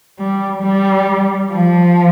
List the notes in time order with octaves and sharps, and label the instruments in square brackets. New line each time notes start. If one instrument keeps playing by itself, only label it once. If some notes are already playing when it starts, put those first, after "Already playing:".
[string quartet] G3
G3
F3